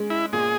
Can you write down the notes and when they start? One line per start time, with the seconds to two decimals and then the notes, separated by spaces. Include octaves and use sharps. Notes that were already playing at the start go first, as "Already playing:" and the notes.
Already playing: G#3 C#4
0.10 E4
0.32 A#2 G#4